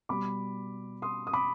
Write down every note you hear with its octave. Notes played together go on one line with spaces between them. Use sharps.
B2 G3 B5 D6
C6 D#6
D#6
B5 D6